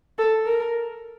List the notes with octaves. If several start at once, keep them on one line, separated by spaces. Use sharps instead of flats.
A4
A#4